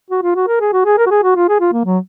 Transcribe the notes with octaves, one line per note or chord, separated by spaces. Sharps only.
F#4
F4
F#4
A#4
G#4
F#4
G#4
A#4
F#4
G#4
F#4
F4
G#4
F4
A#3
F#3